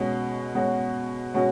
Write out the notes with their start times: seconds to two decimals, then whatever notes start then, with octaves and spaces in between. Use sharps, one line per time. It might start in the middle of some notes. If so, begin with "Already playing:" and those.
Already playing: B2 G#3 C#4 F#4
0.55 B2 G#3 C#4 F#4
1.34 B2 G#3 C#4 F#4